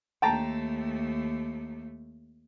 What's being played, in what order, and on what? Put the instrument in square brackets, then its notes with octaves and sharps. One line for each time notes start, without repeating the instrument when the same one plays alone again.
[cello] D#2 A3 [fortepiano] G5 A5 A#5